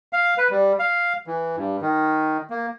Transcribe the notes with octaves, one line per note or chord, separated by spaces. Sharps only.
F5
B4
G3
F5
E3
G2
D#3
A#3